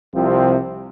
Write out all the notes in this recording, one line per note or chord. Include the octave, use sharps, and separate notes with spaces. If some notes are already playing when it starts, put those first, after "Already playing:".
C2 C3 F3 C4